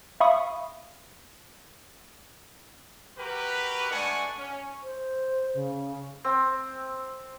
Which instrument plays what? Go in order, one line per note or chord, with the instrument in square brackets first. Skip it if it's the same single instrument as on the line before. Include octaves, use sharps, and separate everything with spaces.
[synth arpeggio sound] E5 F5 B5 C#6 D#6
[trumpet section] F#4 G4 A#4 B4
G#3 A3 D4 F#5 G#5 C#6
C#4
[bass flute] C5
C#3
[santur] C4